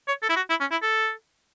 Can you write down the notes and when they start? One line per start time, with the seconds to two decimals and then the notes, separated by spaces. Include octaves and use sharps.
0.08 C#5
0.23 A4
0.29 E4
0.36 F#4
0.50 E4
0.60 C#4
0.71 E4
0.82 A4